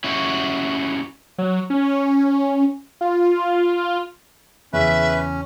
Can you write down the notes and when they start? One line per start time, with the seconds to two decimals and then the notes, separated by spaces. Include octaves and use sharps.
0.04 C#4 E4 F#4 G4
1.38 F#3
1.70 C#4
3.01 F4
4.73 E2 C#3 C#4 B4 E5